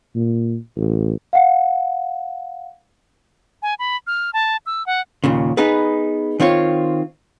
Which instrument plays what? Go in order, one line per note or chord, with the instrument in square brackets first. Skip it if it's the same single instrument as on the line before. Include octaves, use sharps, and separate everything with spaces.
[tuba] A#2
A1
[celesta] F5 F#5
[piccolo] G#5
B5
F6
A5
E6
F#5
[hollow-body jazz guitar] D#2 A#2 C#3
B3 D#4 G#4 B4
D#3 C4 F4 C#5